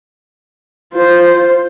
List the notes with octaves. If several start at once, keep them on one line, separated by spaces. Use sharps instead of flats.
F4 C5